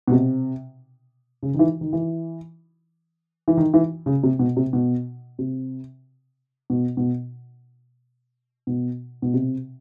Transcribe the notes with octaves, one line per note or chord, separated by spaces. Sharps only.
B2
C3
C#3
D#3
E3
D#3
E3
E3
D#3
E3
C#3
C3
B2
C3
B2
C3
B2
B2
B2
B2
C3